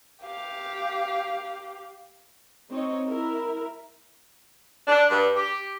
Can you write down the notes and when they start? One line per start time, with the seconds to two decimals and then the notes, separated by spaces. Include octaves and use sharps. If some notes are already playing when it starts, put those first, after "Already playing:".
0.23 G4 F5
2.69 C4 D#4 C#5 D#5
3.08 E4 A#4 E5
4.87 D4
5.10 G2
5.36 G4